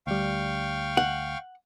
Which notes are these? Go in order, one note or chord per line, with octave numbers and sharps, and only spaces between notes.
D2 G3 F5 G5 C#6
F#5